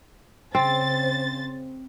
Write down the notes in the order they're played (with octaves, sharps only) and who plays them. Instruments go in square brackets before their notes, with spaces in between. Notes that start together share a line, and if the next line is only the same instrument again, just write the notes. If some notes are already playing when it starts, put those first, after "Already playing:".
[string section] C#3 C5 A6 [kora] C4